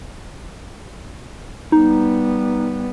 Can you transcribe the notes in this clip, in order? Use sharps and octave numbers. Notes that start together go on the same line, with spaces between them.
G3 B3 D#4